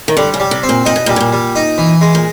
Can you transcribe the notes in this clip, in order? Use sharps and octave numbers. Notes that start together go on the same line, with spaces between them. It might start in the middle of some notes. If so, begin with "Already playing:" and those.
D#3
D3 G3
C#3
G3
C3
C4
A#2
A#2 D#4
B2
A#2 G3
B2
A#2
G3
D#4
E3
G#3
A#2